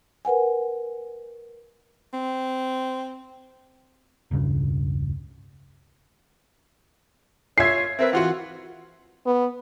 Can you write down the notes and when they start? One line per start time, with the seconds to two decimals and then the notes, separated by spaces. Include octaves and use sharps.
0.25 A#4 B4 F#5 G#5
2.13 C4
4.31 E1 C#2 G2 C#3
7.58 F4 C#5 E5 G#6 C7
7.99 C4 A#4 B4 E5
8.13 E3 F4 F#4 F#5
9.26 B3